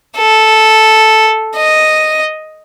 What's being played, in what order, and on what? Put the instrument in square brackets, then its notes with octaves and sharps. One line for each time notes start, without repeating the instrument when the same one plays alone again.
[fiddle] A4
D#5